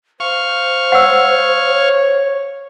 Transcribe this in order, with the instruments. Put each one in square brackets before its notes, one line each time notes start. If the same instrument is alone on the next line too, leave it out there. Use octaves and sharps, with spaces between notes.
[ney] C5 [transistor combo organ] F5 C#6
[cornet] C#5 [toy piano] F#5 E6